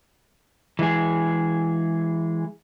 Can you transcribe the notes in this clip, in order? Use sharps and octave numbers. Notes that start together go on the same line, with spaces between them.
E3 G#3 G#4